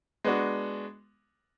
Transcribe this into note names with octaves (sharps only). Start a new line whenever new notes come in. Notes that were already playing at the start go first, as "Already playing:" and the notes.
G#3 B3 D4 F#4